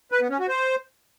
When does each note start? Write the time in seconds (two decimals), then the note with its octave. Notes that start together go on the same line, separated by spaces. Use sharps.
0.12 B4
0.21 B3
0.30 C#4
0.39 F#4
0.48 C5